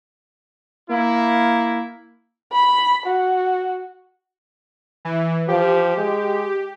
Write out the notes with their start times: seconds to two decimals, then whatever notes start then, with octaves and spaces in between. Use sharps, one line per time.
0.90 A#3 E4
2.52 B5
3.07 F#4
5.05 E3
5.48 F3 G4
5.98 G#3